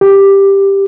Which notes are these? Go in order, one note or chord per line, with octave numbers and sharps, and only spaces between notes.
G4